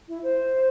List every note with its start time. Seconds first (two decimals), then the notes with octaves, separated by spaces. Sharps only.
0.08 E4
0.23 C5